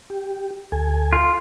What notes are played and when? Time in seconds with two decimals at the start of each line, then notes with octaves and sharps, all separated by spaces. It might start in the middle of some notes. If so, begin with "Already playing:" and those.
0.10 G4
0.72 D2 A4 G#5
1.13 F4